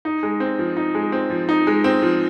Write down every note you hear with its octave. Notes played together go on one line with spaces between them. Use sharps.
D#4
G#3
C4
F3
D#4
G#3
C4
F3
D#4
G#3
C4
F3